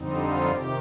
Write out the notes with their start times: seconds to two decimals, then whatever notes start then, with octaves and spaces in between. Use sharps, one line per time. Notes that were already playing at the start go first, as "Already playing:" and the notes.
Already playing: F2 D3 G3 C4 D#4
0.18 F4
0.49 C3 D#3 G4